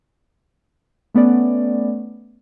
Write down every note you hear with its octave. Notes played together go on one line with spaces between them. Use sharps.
A3 B3 C#4 D5